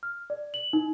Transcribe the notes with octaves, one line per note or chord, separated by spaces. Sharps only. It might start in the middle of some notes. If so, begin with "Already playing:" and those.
F6
D5
F#7
D#4